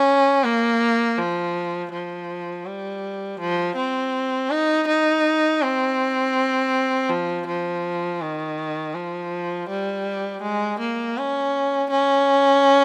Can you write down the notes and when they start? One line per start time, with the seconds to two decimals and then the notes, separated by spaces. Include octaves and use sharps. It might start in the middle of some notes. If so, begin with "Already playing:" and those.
Already playing: C#4
0.44 A#3
1.18 F3
1.92 F3
2.66 G3
3.40 F3
3.76 C4
4.50 D#4
4.87 D#4
5.62 C4
7.10 F3
7.47 F3
8.21 D#3
8.94 F3
9.69 G3
10.42 G#3
10.80 A#3
11.17 C#4
11.90 C#4